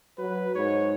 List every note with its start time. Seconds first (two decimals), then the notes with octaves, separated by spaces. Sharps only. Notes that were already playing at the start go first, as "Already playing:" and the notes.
0.18 F#3 B4
0.55 G#2 C#5